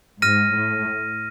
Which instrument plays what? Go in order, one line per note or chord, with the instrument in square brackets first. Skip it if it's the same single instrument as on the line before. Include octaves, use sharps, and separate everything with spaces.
[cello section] G#2 [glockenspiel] F6 A#6 D#7
[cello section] A2